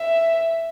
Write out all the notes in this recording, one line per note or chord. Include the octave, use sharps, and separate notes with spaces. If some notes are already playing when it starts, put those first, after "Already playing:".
Already playing: E5